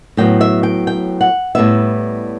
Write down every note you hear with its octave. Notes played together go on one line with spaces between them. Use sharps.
A2 F#3 B3 G5
E5
G5
G5
F#5
A2 G3 B3 E5